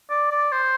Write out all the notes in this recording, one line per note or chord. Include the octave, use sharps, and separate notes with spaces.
D5
D5
C5